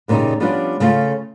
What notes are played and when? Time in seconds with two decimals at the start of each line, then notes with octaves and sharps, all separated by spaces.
0.08 F2 A#2 C#3 G3 D#4
0.40 F3 G3 B3 C#4 D4 F4
0.80 C#3 A3 C#4 F4